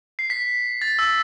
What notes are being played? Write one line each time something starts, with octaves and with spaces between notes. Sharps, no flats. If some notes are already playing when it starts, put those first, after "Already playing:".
C7
B6
A6
E6